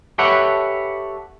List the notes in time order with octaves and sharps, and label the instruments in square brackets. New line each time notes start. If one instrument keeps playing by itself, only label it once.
[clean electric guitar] G4 A4 B4 C#5 E5 F#5